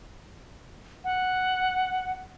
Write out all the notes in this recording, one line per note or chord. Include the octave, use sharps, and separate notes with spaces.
F#5